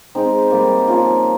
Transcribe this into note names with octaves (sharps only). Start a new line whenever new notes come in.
G#3 C4 D#4
D#3 G3 A#3
F3 A#3 C#4 F4